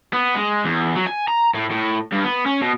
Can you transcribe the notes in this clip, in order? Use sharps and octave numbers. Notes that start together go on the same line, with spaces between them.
B3
G#3
E2
F#3
G#5
A#5
A2
A2
G2
B3
C#4
B2